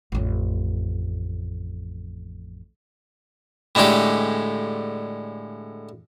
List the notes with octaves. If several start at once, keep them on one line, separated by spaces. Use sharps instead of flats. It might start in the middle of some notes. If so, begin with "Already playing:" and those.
A1 F2
A2 D3 G#3 C#4 G4